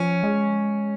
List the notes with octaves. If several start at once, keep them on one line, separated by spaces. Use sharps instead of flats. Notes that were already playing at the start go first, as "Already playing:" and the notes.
Already playing: F3 C#4
G#3